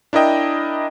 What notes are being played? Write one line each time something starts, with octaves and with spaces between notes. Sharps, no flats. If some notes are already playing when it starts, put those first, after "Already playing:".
D4 E4 A#4 D#5 G5